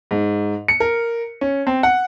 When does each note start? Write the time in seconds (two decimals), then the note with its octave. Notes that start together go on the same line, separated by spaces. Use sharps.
0.11 G#2
0.68 C#7
0.80 A#4
1.41 C#4
1.67 C4
1.83 F#5